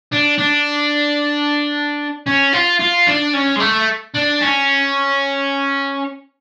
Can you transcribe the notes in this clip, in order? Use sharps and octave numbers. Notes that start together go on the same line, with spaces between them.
D4
D4
C#4
F4
F4
D4
C#4
G#3
A3
D4
C#4